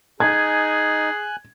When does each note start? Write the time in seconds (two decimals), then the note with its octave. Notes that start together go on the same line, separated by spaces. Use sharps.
0.20 D#4 G#4 G#5 F#6 G#6